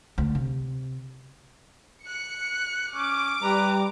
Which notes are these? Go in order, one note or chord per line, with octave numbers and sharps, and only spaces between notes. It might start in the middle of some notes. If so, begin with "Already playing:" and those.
D2
C3
F#6 C#7
C#4 D6
G3 B4 A#5